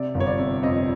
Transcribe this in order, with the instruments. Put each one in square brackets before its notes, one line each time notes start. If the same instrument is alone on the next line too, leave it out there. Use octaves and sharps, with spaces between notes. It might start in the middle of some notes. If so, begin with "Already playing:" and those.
Already playing: [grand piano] C3 D5
G1
C#5
D5
C3
F2 D#5